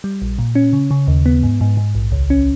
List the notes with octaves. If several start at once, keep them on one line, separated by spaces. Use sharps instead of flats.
G3
A#1
A#2
C#4
C#3
C#3
D#2
B3
G#2
G#2
G#2
A#1
C#2
C#4